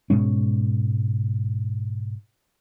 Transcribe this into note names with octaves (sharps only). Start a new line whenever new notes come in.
G#2 B2 G#3 C#4